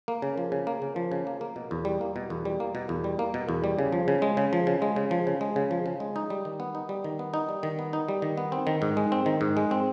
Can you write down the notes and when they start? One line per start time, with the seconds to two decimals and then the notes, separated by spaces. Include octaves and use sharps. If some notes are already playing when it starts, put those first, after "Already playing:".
0.08 A#3
0.22 C#3
0.38 F3
0.52 C#3
0.67 A#3
0.82 C#3
0.96 F3
1.12 C#3
1.27 A#3
1.41 A#3
1.56 B2
1.71 E2
1.85 G3
2.01 A#3
2.16 B2
2.30 E2
2.45 G3
2.60 A#3
2.75 B2
2.89 E2
3.04 G3
3.19 A#3
3.34 B2
3.49 E2
3.64 G3
3.79 C#3
3.92 F3
4.08 C#3
4.22 G#3
4.37 C#3
4.53 F3
4.67 C#3
4.82 G#3
4.96 C#3
5.11 F3
5.27 C#3
5.41 G#3
5.56 C#3
5.71 F3
5.86 C#3
6.00 G#3
6.16 D#4
6.30 G3
6.45 D#3
6.60 B3
6.75 D#4
6.89 G3
7.04 D#3
7.19 B3
7.34 D#4
7.49 G3
7.63 D#3
7.79 B3
7.93 D#4
8.09 G3
8.22 D#3
8.37 B3
8.52 C4
8.67 D#3
8.82 G#2
8.97 G#3
9.12 C4
9.26 D#3
9.41 G#2
9.57 G#3
9.71 C4